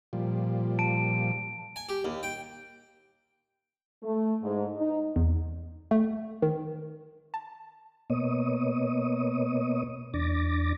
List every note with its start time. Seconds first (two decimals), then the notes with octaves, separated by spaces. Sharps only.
0.13 A#2 F3 G3
0.79 A5 D7
1.76 G#5
1.89 G4
2.05 D#2
2.23 G5
4.03 A3
4.42 G#2
4.77 D#4
5.16 E2
5.91 A3
6.42 D#3
7.34 A5
8.10 B2 A#3 B3 C#5 D#5 D#6
10.14 E2 D4 D6 A6 A#6